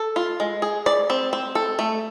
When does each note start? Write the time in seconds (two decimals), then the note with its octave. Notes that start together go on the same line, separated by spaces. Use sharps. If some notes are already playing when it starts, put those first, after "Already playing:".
Already playing: A4
0.16 F4
0.40 G#3
0.62 G#4
0.86 D5
1.10 C4
1.33 C4
1.55 A4
1.79 A3